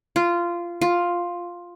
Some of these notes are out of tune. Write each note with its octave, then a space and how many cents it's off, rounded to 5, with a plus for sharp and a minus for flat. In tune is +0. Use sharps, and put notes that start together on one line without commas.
F4 -15
F4 +5